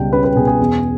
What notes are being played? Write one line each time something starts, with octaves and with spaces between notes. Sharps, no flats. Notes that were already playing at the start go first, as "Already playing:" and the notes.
Already playing: C#2 B2 G3 G5
C#4 B4
B4
B2 G#4
G#4
E2